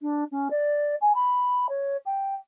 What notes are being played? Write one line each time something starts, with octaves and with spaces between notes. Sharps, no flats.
D4
C#4
D5
G#5
B5
C#5
G5